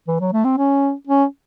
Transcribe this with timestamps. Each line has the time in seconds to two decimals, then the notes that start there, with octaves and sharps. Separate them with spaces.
0.08 E3
0.20 F#3
0.33 A3
0.45 C4
0.58 C#4
1.07 C#4